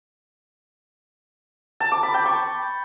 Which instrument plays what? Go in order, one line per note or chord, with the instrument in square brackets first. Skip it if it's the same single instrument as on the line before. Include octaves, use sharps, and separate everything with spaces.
[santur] A5
D6
B5
G5
C#6